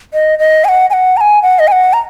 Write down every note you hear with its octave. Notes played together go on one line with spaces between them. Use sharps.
D#5
D#5
G#5
F#5
G#5
F#5
A#5
G#5
F#5
D#5
G#5
F#5
A#5